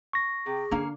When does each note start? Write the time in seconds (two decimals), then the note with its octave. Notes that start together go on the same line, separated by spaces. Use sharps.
0.13 C#6 A#6
0.46 C3 G#4 G5
0.71 D3 A#3 C#4 D4 F5